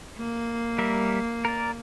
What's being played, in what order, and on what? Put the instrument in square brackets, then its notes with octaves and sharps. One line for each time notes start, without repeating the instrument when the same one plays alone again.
[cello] A#3
[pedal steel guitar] G3 A#4 E5
A#4 D5